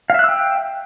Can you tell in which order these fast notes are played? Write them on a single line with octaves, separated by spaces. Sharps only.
F5 E5 F#6 E6 G5